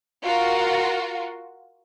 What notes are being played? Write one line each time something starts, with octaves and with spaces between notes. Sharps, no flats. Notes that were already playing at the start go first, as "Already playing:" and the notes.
F4 F#4 A#4